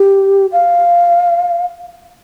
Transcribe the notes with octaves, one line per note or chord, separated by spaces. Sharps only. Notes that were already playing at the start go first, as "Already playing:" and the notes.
Already playing: G4
F5